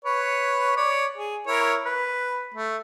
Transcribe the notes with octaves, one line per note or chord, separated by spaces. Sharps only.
B4 C#5
C#5 D5
G#4
E4 A#4 C#5
B4
A3